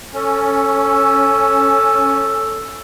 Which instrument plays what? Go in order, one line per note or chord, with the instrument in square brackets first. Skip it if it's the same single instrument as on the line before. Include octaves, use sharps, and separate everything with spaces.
[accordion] C#4 [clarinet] A4